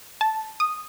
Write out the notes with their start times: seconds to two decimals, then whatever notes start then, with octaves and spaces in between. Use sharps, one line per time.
0.21 A5
0.60 D#6